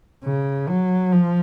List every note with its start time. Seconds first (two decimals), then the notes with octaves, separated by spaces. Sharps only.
0.24 C#3
0.68 F#3
1.12 F3